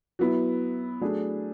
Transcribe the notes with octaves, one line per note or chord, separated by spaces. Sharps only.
F#3 B3 E4
F#3 A3 D4 G#4